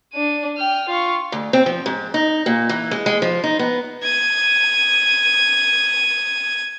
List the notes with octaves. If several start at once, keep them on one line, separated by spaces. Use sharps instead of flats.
D4 D#7
G5 F6
F4 C#6
D2
C4
F3
G#2
D#4
A#2
E3
G#3
G#3
F3
D#4
B3
G#6 D#7